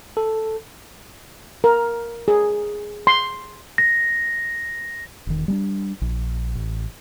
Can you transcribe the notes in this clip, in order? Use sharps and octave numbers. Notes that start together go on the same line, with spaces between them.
A4
A#4
G#4
C6
A#6
E1 D#3
G3 G#3 D4
A#1
A1